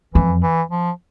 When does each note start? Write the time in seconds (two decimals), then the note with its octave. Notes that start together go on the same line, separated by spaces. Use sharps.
0.14 F2 E3
0.43 E3
0.71 F3